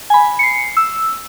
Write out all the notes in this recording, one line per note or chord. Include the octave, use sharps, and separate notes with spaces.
G#5 B5
C7 C#7
E6